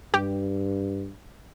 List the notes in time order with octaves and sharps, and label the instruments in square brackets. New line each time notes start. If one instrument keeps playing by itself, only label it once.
[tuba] G2 [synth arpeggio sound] G4